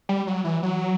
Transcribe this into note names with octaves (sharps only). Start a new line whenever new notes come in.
G3
F#3
E3
F#3